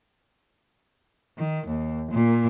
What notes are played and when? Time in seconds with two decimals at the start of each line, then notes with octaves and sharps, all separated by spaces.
1.38 D#3
1.67 D#2
2.11 A#2